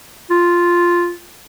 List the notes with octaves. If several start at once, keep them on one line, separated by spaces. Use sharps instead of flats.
F4